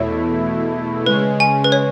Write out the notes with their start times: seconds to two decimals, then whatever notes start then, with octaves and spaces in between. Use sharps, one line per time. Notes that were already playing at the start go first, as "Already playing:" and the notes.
Already playing: E2 B2 A3 E4 C#5
1.06 C#3 G#3 C#4 B4
1.40 G#5
1.64 B4
1.72 C#5